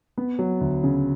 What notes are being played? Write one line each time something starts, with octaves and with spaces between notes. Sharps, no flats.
B3
F#3
D2
C#3